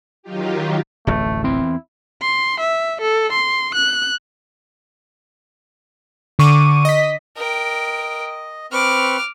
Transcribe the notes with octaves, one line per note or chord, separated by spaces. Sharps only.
D#3 F#3 D#4 F4 G4
D1 A1 F2 A3
E2 C4 E4 C6
C6
E5
A4
C6
F#6
D3 C#6 D6 D#7
D#5 B6
A#4 D#5 G5
C4 B4 C#6 D6 F6